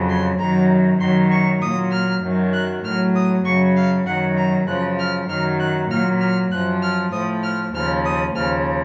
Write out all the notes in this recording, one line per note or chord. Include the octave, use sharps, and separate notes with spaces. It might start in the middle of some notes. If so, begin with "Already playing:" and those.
Already playing: F2 C#3 F#3
C6
F#2 D#3 F#3 A#5
F#2 D#3 F#3 C6
C#6
A#2 F#3 D#6
F6
F#2 D#3 F#3
F#6
A2 F#3 F6
D#6
F#2 C#3 F#3 C#6
F5
F#2 D#3 F#3 F#5
A#5
F#2 C#3 F3 F#6
F6
F#2 D#3 F#3 F6
F#6
A#2 F#3 F6
F6
F#2 F3 F#6
F6
A2 F3 D#6
F6
D#2 C#3 F3 F6
D#6
D#2 C#3 F3 F6